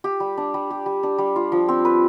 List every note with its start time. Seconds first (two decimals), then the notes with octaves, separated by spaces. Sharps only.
0.04 G4
0.20 G3
0.37 D4
0.54 G3
0.70 G4
0.86 G3
1.03 D4
1.18 G3
1.36 F4
1.52 F3
1.68 C4
1.85 B4